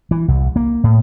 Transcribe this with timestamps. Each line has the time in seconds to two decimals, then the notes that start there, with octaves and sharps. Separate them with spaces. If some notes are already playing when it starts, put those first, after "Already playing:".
0.11 E3
0.28 C2
0.56 A#3
0.84 A2